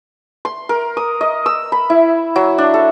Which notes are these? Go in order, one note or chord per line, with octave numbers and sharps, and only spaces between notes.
C6
A#4
D#6
D#5
E6
B5
E4
F#3
D4
A4